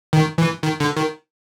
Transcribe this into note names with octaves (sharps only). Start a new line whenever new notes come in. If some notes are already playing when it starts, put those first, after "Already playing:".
D#3
E3
D#3
D3
D#3